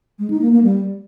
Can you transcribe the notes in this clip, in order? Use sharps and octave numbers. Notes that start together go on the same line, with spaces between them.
G#3
D#4
A#3
A#3
G3